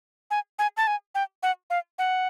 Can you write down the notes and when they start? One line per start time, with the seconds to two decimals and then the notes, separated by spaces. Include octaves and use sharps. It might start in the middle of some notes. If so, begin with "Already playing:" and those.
0.31 G#5
0.59 G#5
0.77 A5
0.87 G#5
1.15 G5
1.43 F#5
1.70 F5
1.99 F#5